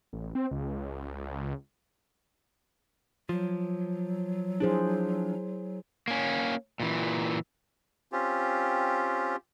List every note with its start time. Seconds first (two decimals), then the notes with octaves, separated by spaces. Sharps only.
0.13 A1
0.35 C4
0.51 C#2
3.29 F3 F#3
4.60 F3 D4 E4 G#4 C5
6.08 A#3 C#4
6.80 A#2 E3
8.12 C4 C#4 F4 G4